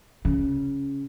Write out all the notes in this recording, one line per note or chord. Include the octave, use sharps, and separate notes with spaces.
C#3